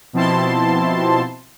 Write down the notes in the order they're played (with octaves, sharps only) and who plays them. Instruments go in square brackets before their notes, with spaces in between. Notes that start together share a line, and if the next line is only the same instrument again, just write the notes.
[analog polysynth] B2 F3 C4 E4 A5 C6